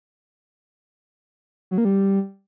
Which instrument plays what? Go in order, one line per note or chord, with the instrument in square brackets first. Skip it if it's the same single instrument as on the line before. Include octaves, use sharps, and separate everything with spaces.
[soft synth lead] F#3
A#3
G3